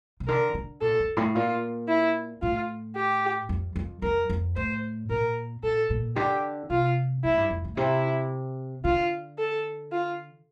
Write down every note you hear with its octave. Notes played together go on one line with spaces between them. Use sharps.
C3
D3 A#4
D3
A#2 A4
F2
A2
A#2 F4
E4
A2 F4
G4
F2
F2
F2 A#4
F2
A2 C5
A#2 A#4
A#2 A4
A#2
D3 G4
C3 F4
A2 E4
G2
F2
A2
C3 E4
D3 F4
A4
F4